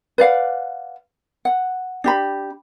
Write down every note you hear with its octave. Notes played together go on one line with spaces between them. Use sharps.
B4 D5 F5 F#5
F#5
D4 G4 B5